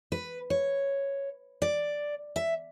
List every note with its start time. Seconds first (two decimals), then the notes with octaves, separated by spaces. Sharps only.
0.12 B4
0.50 C#5
1.62 D5
2.36 E5